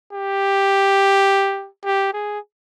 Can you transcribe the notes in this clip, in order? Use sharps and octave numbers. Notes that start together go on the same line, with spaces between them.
G4
G4
G#4